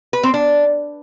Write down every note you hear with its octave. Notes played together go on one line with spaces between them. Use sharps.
B4
C4
D4